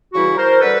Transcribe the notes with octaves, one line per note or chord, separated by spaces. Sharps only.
C#3 E3 G3 E4 F#4
A#4 C5
D3 G3 A4 B4